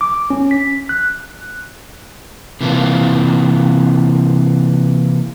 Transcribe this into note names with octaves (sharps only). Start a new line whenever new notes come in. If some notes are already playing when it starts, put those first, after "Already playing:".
D6
C#4
B6
F#6
C3 E3 A#3 F4